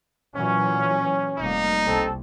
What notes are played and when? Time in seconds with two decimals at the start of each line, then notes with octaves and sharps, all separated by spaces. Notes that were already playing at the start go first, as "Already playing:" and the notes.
0.35 A#2 E3 F#3 C#4
1.39 F1 G3 A#3 D#4
1.86 C2 C4 A4